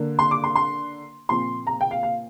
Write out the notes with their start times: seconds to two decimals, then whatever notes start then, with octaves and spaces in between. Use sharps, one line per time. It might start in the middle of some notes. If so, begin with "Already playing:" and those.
Already playing: D3 A#3 D4
0.19 C6
0.31 D6
0.44 C6
0.55 C6
1.29 A#2 F3 C4 C6
1.67 A#5
1.81 G5
1.91 F5
2.03 F5